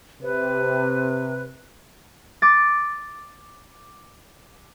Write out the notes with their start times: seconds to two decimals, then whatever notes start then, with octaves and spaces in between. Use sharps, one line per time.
0.22 C3 B4
2.42 D6 A6